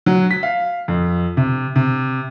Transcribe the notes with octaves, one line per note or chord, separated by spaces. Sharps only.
F#3
B6
F5
F2
C3
C3